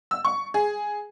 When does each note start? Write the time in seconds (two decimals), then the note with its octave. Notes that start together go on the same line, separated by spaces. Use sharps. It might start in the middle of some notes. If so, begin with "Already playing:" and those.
0.11 E6
0.25 C#6
0.54 G#4